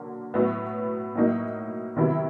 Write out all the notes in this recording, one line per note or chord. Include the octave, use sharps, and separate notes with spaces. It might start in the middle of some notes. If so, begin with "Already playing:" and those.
Already playing: D3 F#3 A#3
A2 F#3 B3
A2 F#3 A#3 D#4
C3 D#3 F#3 B3 E4